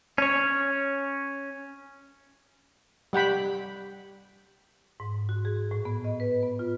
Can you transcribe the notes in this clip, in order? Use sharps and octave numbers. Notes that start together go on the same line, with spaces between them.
C#4 C#5
G3 F#5 G5 B5
G#2
F#4
G#4
A2
B3
D#5
B4
B3
F4